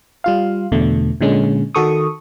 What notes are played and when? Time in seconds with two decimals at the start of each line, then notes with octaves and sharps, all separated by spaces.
0.24 G3 F4 F5
0.72 E2 B2 D3 A3
1.21 A#2 D3 G#3 C#4
1.75 D#3 F#4 A4 C#6 D#6